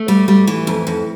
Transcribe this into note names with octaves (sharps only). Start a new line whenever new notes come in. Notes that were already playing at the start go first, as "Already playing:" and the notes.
Already playing: A3
G3
G3
E3
F2
F2